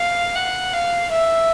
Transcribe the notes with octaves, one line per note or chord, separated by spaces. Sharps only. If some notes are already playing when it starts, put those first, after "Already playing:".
Already playing: F5
F#5
F5
E5